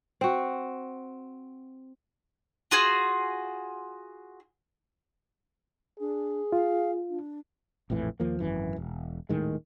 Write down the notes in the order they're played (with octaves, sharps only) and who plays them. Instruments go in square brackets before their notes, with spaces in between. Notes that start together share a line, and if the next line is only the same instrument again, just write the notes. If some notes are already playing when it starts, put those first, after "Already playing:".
[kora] C4 F#4
[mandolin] F4 F#4 G#4
[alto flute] D4 [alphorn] G#4
[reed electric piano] F4 [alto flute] F5
[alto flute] D4
[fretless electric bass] A#1 F2 A2 E3
D#2 F3 A#3
G#1 F#2 E3
E1
D#1 A2 D#3 G#3